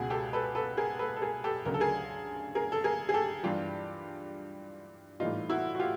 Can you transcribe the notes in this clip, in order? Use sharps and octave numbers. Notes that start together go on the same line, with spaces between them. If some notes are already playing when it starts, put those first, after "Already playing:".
Already playing: C#2 B2 G#3 F#4 G#4
G4 A4
A4 B4
A4 B4
G#4 A#4
A4 B4
A4
G#4 A#4
G4 A4
D2 C#3 F#3 A#4
A4
G#4 A#4
G#4 A#4
A4
G#4 A#4
G#4
G4 A4
G2 E3 G3 F4 G4
A2 E3 G3 D#4 F4
E4 F#4
F#4
F4 G4